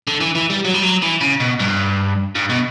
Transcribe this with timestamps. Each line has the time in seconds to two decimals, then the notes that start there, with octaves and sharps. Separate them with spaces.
0.07 D3
0.21 E3
0.35 E3
0.50 G3
0.65 F#3
0.74 G3
0.83 F#3
1.02 E3
1.21 C#3
1.40 B2
1.60 G2
2.35 G2
2.50 B2